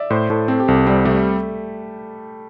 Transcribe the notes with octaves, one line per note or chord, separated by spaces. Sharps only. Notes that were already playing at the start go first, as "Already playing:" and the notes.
Already playing: D5 E5
A2 C5
A2 A4
C4 A4
G4
C2 A4
G3 C4
G3 A3